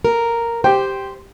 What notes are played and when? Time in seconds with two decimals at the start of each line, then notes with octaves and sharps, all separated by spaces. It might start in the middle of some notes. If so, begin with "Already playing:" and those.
0.05 A#4
0.64 G4 C5 G5